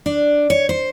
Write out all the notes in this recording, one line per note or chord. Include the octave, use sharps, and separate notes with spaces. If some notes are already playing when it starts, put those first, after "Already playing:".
D4
C#5
C5